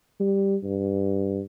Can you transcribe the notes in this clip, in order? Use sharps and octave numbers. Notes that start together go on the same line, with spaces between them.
G3
G2